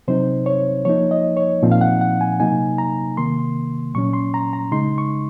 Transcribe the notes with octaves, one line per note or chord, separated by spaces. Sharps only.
C3 F#3 C4 D#4 C5
C#5
F3 A#3 D#4 C#5
D#5
C#5
A#2 F3 C4 D#4
F5
F#5
F#5
G#5
C3 F#3 A#3 D#4 G#5
A#5
C3 D#3 A#3 C6
A#2 F#3 C#4 C#6
C6
A#5
A#5
C#3 G#3 D#4 C6
C#6